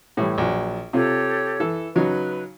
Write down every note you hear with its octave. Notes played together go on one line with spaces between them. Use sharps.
A2 E3 G3
A#1 F#3
C3 F4 G4 A4 C#5
E3 A4
C#3 F#3 D#4 B4